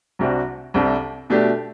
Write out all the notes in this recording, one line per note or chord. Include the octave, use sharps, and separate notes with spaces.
C2 C3 G3 D4 F#4
C2 C3 G3 D4 A4
B2 A3 D4 G4